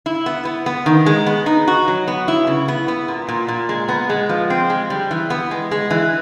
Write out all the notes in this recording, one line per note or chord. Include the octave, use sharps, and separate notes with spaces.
E4
B3
B3
B3
D#3
G#3
B3
D#4
F#4
F#3
B3
E4
C#3
B3
B3
A#2
A#2
A#2
G#3
B3
G#3
F3
C4
G#3
G3
E3
B3
G#3
G#3
E3